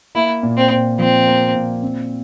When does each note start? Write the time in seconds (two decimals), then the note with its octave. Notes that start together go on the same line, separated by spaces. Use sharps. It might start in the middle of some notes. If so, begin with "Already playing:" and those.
0.15 A#3 E4
0.43 A#2
0.57 C4
0.70 A#2
0.99 F3 C4
1.27 A#3
1.55 A#2
1.82 C4